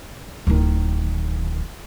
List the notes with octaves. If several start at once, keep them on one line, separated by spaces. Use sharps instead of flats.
D1 D#3